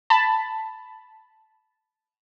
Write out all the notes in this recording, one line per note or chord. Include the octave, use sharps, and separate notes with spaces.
A5 B5